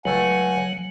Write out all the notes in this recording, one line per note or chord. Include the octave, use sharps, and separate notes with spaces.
C#2 F#3 A3 F#5 G#5